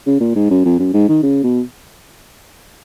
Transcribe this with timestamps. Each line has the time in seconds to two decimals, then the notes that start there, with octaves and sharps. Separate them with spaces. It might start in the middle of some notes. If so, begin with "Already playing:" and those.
0.06 C#3
0.21 A#2
0.36 G#2
0.50 F#2
0.65 F2
0.79 F#2
0.94 G#2
1.09 D#3
1.23 C#3
1.43 B2